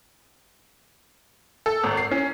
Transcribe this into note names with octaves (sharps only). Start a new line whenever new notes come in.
A4
G#1
C7
C#4